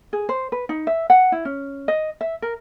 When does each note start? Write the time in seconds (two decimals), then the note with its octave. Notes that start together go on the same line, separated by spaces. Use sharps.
0.13 G#4
0.29 C5
0.52 B4
0.69 D#4
0.87 E5
1.10 F#5
1.32 E4
1.45 C#4
1.88 D#5
2.21 E5
2.42 A#4